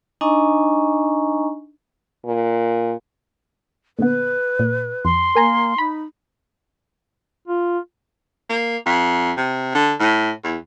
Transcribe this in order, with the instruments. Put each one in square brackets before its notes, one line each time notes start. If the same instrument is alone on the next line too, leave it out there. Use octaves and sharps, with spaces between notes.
[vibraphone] D4 D#4 D#5 G#5 A#5 C#6
[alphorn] A#2
[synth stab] A#2 D3 B3 [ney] B4
[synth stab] A#2
[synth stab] F2 [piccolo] C6
[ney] A#3 [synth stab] A#4 G#5 A#5
[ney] D#4 [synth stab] B5
[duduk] F4
[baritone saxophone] A#3
F2
C3
D3
A2
E2